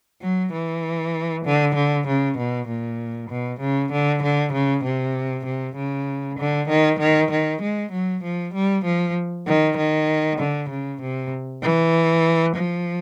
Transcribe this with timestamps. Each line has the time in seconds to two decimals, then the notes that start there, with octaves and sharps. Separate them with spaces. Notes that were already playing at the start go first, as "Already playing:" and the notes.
0.22 F#3
0.53 E3
1.46 D3
1.75 D3
2.07 C#3
2.38 B2
2.68 A#2
3.30 B2
3.60 C#3
3.92 D3
4.23 D3
4.53 C#3
4.84 C3
5.46 C3
5.76 C#3
6.39 D3
6.69 D#3
7.00 D#3
7.31 D#3
7.62 G#3
7.92 F#3
8.24 F3
8.54 G3
8.85 F3
9.47 D#3
9.77 D#3
10.39 D3
10.70 C#3
11.02 C3
11.63 E3
12.56 F3